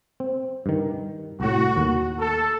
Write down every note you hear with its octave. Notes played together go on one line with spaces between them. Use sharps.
C4
G2 D#3
C2 A2 F#4
D#2
A4